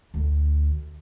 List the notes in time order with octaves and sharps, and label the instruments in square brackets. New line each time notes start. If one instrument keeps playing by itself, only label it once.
[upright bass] D2